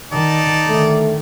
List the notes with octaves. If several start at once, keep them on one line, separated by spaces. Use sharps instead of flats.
D#3 D#4 D5 A5
D3 D#3 A3